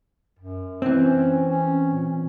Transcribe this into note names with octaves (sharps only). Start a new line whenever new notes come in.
F#2
E3 C4
C#4
C#4
A#2